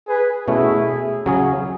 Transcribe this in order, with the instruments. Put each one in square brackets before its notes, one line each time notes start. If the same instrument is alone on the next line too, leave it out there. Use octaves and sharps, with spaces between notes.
[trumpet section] G#4 B4
[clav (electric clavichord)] B2 A3 C#4 [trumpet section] E4 G#4
[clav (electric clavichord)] C#3 F#3 C#4 G#4